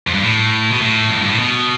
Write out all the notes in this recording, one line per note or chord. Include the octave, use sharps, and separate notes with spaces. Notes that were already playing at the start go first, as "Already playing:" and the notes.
F2
G2
A2
B2
A2
F2
G2
A2
B2